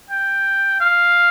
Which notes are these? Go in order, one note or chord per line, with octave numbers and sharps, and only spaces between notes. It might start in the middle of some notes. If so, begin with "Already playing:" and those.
G5
F5